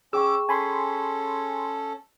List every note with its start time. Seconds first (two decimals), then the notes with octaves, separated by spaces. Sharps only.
0.13 C#4 G#4 G5 C#6 D6 E6
0.49 C#4 A4 G#5 B5 C6